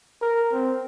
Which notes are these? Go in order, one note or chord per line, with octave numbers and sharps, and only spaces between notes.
A#4
C4